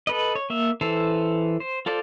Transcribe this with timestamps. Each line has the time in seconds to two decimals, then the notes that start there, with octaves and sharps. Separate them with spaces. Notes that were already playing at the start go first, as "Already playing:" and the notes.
0.07 A4 B4 D#5
0.35 C#5
0.50 A#3 E5
0.81 E3 A4 C5
1.60 C5
1.86 F4 A4 C5 D5